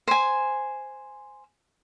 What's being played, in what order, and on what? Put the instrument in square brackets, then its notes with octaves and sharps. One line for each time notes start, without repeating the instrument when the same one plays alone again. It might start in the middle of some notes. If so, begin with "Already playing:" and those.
[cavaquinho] C5 G#5